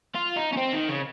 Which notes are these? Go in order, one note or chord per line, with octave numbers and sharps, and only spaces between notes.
F4
D#4
C#4
C4
D#3
C#3